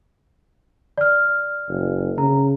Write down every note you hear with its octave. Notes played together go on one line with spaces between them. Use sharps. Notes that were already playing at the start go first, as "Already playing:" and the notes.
D5 F6
F#1
C#3 A#5